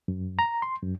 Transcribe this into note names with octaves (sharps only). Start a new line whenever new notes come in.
F#2
A#5
C6
F#2